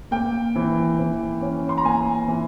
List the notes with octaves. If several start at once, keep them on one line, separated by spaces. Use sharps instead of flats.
A#3 G5
E3
E3
C#4
C6
A#5
A#3 G#5
E3